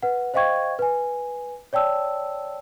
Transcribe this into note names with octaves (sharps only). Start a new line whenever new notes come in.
B4 F#5
C5 D#5 F5 G5 C#6 G#6
B4 G#5
C#5 D5 G5 A5 E6